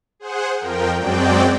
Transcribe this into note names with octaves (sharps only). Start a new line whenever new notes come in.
G#4 C5 F#5
F2 F3 A#4 G5
F#2 F#3 G#3 C4 D5 G5